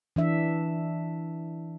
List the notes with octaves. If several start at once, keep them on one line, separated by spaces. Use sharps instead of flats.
E3 D4 E5